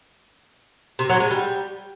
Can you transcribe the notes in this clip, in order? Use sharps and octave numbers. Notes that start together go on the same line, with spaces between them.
C3
F#3
G#3
G3